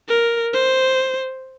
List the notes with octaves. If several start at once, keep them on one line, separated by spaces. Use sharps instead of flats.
A#4
C5